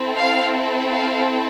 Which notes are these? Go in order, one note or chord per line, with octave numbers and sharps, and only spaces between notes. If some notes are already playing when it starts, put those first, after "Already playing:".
Already playing: C4 E4 A4
F5
F5